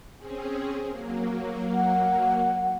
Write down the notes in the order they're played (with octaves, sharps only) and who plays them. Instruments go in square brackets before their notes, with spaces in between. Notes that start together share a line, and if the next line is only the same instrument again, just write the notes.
[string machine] C4 C#4 G#4
F#3 A#3
[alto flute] F#5